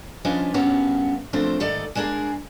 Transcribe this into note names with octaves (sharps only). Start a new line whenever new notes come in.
F3 C#4 D4 F4 B4 D#5
G2 A#3 B3 C#4 F#4 A5
F3 A3 C4 D4 C5
G#2 D#3 A3 A4 D5 D#5
G#3 A#3 D4 E4 G#4 A#4